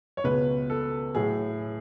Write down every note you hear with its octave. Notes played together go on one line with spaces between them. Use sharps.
C#5
C#2 B2 G#3 B4
A4
A2 F#3 G#4